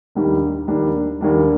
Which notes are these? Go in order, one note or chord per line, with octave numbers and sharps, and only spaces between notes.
D#2 D#3 G3 A#3 D4
D#2 D#3 G3 A#3 D4
D#2 D#3 G3 A#3 D4